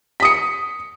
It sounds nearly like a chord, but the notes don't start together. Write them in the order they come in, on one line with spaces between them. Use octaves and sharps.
B6 D#6 C#7